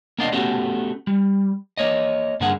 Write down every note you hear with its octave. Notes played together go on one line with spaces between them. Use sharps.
A#3 B3 D4 D5 D#5 F5
A3 B3 C#4 F#4 G4 A4
G3
A#3 C#5 D#5
G2 D3 A#3 G#4 F#5